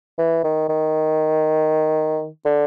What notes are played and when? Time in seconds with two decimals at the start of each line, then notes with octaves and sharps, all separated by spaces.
0.19 E3
0.44 D#3
0.69 D#3
2.45 D3